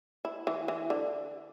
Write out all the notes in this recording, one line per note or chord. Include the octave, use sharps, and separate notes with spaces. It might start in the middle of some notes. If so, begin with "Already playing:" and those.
E4
E3
E3
D3